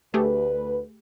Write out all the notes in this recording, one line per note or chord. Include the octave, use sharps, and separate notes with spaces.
D2 A3 G4 G#4 B4